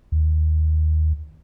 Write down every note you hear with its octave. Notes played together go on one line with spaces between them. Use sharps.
D#2